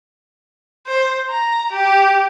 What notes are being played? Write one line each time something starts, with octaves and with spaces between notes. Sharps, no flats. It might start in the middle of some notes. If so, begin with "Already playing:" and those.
C5
A#5
G4